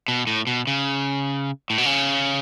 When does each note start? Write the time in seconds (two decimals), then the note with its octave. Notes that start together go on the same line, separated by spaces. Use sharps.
0.08 B2
0.27 A2
0.47 B2
0.67 C#3
1.70 A2
1.78 B2
1.86 C#3